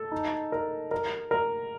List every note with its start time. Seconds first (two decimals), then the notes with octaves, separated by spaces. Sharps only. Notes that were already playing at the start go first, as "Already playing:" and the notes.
Already playing: A4
0.12 D#4
0.52 A#4
0.91 A#4
1.31 A#4